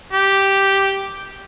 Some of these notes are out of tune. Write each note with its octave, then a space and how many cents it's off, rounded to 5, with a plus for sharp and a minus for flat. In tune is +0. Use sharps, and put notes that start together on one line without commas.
G4 -5